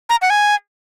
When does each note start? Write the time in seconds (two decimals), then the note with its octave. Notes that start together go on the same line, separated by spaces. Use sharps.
0.10 A#5
0.22 F#5
0.30 G#5